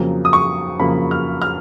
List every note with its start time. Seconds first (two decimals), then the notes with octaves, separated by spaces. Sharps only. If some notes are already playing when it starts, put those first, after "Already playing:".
Already playing: F2 C#3 F#3 A#3
0.25 D#6
0.33 C#6
0.79 F2 C#3 F#3 A#3 B5
1.11 F6
1.42 F6